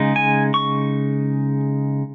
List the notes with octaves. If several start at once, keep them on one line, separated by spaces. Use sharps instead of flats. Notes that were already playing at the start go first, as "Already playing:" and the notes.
Already playing: C#3 G#3 D#4
G#5
C#6